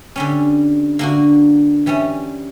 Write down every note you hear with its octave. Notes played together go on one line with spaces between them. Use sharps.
D3 G3 C#4
D3 A#3 D4 F#4
E3 G3 C#4